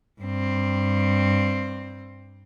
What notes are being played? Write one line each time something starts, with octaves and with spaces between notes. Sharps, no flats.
G2 C4